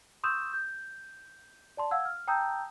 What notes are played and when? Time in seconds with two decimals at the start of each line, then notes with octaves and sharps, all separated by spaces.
0.24 C6 C#6 D#6 E6 G6 E7
0.53 G6
1.77 D5 A5 C6
1.91 F5 F#5 E6 G#6
2.05 F6
2.28 G5 A5 A#5 D#6 E6 G6